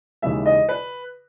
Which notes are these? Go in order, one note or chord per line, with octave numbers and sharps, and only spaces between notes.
D#2 C#3 E3 G#3 E5
D#5
B4